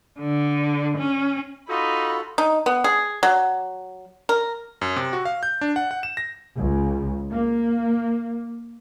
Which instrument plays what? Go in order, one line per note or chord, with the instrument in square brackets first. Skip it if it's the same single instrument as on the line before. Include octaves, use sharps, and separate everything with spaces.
[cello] D3
C#4
[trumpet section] D#4 [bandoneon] F4 F#4 A4 [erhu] B5
[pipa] D#4
B3
G#4
F#3
A#4
[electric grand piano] F#2
C3
F#4
F5
G6
D4
F#5
F#5
E7
A#6
[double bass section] C#2
A#3